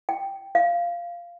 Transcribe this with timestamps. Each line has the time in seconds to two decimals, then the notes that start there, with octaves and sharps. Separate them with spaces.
0.09 G5
0.55 F5